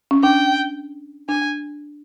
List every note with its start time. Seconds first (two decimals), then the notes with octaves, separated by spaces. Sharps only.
0.11 C#4
0.23 D4 G5
1.29 D4 G#5